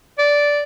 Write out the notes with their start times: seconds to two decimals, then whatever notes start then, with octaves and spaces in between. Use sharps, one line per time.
0.18 D5